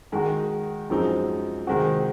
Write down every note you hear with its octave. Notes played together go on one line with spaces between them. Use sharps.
D#3 G#3 D#4 F#4
F#2 F3 G#3 C4 D#4
C3 D#3 G#3 C4 F#4